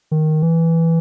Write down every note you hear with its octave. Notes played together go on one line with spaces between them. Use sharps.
D#3
E3